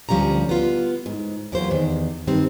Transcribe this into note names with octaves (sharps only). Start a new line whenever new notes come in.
D2 F3 G3 C#4 A#5
B3 F4
G#2
E2 F#3 A#3 F4 G4 C5
E2 D#3
G2 D#3 G3 C4